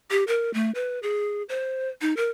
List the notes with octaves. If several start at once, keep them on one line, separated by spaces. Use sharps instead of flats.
G4
A#4
A3
B4
G#4
C5
D#4
A#4